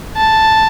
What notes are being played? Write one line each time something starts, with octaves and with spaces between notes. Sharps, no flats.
A5